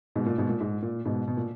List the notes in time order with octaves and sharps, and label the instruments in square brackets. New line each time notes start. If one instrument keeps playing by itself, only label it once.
[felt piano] G#2 B2
A#2
G#2 B2
A#2
G#2
A#2
G#2 B2
B2
A#2